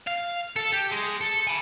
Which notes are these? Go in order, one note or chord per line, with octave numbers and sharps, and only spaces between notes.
F5
A4
G4
G#3
A4
G#5 B5